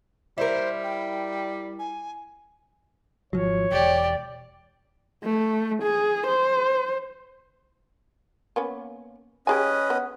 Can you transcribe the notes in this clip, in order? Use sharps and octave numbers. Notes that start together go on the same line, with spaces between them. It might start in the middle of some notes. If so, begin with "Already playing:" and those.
G3 E4 A#4 C5
G5
G#5
G#1 F3 F#3 C#5
E1 G4 D5
A3
G#4
C5
A#3 B3 C#4
C#4 G4 G#4 B4 D#5 G#5
B3